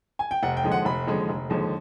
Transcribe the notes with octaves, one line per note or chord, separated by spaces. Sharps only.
G#5
G5
F1 F#5
G5
D#2 D3 F3 G#3
F#5
F1 B5
D#2 D3 F3 G#3
F1
D#2 D3 F3 G#3